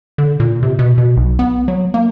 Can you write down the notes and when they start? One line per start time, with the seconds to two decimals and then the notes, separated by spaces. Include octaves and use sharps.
0.18 D3
0.40 A#2
0.63 C3
0.79 B2
0.98 B2
1.17 B1
1.39 B3
1.68 F#3
1.94 A#3